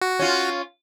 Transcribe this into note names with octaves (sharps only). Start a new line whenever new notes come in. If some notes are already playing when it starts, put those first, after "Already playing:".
F#4
C#4 F4